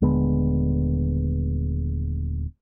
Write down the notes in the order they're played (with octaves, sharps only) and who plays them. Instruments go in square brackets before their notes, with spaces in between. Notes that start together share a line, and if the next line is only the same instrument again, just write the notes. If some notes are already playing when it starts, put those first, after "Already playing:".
[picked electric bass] D#1 D3 G#3 B3